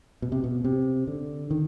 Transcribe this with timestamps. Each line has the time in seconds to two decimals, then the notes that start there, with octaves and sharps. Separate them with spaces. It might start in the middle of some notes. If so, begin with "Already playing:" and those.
0.22 B2
0.32 C3
0.44 B2
0.64 C3
1.07 D3
1.51 D#3